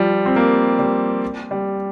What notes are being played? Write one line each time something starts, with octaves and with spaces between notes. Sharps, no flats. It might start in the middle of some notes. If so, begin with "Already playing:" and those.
Already playing: F3 G3
C4
A#3
G3
G3